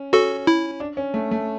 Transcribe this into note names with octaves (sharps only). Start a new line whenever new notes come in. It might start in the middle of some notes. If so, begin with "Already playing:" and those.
Already playing: C#4
C#4 F#4 A4
E4
D4
C#4
A3
A3